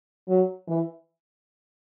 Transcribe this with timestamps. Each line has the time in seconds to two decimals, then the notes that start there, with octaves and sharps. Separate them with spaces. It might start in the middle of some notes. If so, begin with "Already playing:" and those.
0.28 F#3
0.67 E3